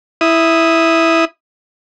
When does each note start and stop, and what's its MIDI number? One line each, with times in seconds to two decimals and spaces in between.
0.21 1.25 64
0.21 1.25 87